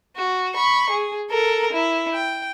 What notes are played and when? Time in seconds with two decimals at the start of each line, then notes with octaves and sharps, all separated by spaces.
0.16 F#4
0.55 B5 C#6
0.90 G#4
1.31 A4 A#4
1.73 E4
2.14 G5